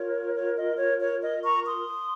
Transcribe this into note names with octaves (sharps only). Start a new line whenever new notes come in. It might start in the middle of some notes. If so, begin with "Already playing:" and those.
Already playing: F4 A#4 C#5
C#5
D#5
C#5
C#5
D#5
A#5 C#6
C6 D#6